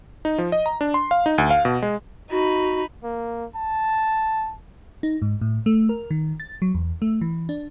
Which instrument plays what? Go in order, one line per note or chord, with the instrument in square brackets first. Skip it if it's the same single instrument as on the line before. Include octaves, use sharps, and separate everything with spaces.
[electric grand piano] D#4
F3
D#5
A#5
D4
C6
F5
D#4
D2
F5
B2
G#3
[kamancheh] D#4 B5 [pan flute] F#4
[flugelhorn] A#3
A5
[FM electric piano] D#4
G#2
A2
A3
A#4
D#3
A6
F#3
E2
A3
E3
D4